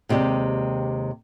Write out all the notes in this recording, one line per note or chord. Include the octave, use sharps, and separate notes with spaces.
D#2 C3 G#3 G4 D5